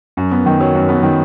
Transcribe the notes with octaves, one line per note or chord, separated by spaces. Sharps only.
F#2
B3
D#3
F#3
F#2
B3
D#3